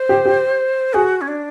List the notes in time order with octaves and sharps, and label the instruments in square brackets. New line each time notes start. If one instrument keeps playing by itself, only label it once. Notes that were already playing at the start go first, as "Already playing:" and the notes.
Already playing: [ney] C5
[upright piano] G4
G4
[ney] F#4 [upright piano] G#4
[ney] C#4
D4